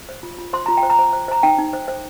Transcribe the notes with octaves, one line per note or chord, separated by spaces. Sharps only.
C5
F4
F4
C5 C6
F4 A#5
G5
C5
A#5
C5
C5
C5 A#5
D#4 G5
D#4
C5
C5